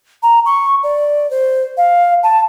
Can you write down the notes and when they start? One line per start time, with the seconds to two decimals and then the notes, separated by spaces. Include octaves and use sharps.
0.23 A#5
0.45 C#6
0.83 D5
1.31 C5
1.77 F5
2.23 A5